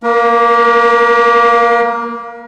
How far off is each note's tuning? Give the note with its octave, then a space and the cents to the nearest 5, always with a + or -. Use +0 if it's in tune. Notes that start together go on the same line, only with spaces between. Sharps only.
A#3 +0 A#4 +40